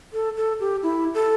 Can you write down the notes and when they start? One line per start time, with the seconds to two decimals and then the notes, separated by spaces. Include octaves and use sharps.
0.13 A4
0.37 A4
0.60 G4
0.83 E4
1.14 A4